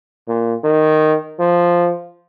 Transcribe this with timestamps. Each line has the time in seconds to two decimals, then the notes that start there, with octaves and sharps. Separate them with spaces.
0.28 A#2
0.64 D#3
1.39 F3